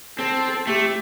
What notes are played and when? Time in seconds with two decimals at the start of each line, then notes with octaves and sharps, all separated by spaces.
0.19 C4 A4
0.67 A3 G4